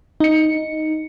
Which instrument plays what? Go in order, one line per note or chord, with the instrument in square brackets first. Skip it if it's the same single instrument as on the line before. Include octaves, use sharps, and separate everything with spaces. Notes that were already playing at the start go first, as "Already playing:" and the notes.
[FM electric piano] D#4 C#7